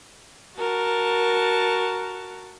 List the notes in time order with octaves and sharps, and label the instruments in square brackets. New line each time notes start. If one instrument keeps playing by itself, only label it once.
[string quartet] F#4 A#4 A5